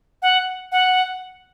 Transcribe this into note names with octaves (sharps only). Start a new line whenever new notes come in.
F#5
F#5